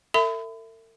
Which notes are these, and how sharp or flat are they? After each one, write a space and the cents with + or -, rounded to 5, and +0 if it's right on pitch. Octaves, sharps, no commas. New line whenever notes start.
A4 +45 E5 +0 B5 +35